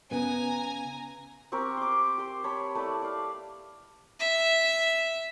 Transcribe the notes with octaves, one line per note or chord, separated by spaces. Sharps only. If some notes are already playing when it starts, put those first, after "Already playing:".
C#3 B3 G#5 A#5
C4 G4 A#4 C#6
C6 D6
G4 C5 C6
C#5 A5 B5
A3 E4 B4 D5
D5 F5
E5